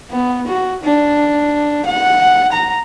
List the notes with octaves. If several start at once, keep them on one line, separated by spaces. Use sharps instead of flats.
B3
F#4
D4
F#5
A#5